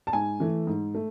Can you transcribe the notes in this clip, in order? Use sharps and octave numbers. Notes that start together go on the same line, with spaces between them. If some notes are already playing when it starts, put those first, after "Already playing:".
A5
G#2 G#5
E3 A3
G#2
A3